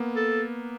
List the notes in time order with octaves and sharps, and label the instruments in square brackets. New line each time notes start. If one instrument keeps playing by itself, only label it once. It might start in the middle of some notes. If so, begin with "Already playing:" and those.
Already playing: [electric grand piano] A#3 B3
[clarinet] A4